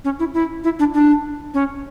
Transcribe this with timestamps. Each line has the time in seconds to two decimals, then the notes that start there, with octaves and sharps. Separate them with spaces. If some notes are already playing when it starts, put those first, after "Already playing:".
0.04 C#4
0.19 E4
0.34 E4
0.64 E4
0.79 D4
0.94 D4
1.54 C#4